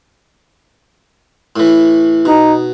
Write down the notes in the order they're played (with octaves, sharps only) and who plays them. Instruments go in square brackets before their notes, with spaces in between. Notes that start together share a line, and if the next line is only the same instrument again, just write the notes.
[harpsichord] A2 E3
[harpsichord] B2 [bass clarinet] D#4